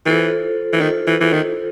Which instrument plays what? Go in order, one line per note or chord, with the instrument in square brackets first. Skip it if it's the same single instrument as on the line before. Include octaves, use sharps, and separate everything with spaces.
[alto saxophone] E3 [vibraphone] F4 A4 C5
[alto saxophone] E3
[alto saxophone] D#3 [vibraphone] F4 A4 C5
[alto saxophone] E3
E3
D#3